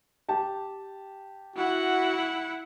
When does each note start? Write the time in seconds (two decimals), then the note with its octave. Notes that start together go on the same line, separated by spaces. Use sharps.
0.29 G4 A5
1.56 E4 F#4 F#5